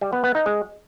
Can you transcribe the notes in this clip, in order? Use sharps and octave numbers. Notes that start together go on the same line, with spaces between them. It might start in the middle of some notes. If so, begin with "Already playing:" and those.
G3
B3
B3
D#4
G#3